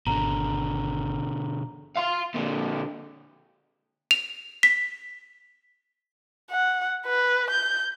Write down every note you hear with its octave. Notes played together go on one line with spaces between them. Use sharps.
G#1 B2 D3 A#5
F5 C6
A#2 D3
F7
B6
F#5
B4
G6